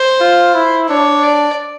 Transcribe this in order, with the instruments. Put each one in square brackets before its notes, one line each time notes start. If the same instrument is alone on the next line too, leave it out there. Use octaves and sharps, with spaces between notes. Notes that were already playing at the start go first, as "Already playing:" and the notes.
Already playing: [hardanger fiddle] C5
[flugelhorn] F4
E4
[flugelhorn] D4 [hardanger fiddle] C#5
[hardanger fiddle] D5